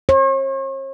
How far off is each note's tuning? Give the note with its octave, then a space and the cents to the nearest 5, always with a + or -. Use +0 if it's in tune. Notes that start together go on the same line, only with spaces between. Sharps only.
C#5 -45